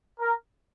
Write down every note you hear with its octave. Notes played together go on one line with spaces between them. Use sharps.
A#4